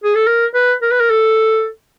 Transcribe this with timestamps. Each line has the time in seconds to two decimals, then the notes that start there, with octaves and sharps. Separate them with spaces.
0.04 G#4
0.15 A4
0.27 A#4
0.54 B4
0.82 A#4
0.91 B4
1.00 A#4
1.10 A4